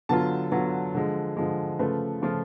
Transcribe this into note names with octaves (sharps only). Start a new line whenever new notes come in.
D3 F#3 B3 F4 A5
D3 F#3 B3 F4
D3 F3 G#3
D3 F3 G#3
C#3 F3 A3 F4 B4
C#3 F3 A3 F4